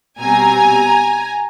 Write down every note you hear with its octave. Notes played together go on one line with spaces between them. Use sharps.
B2 G3 C4 G#5 A#5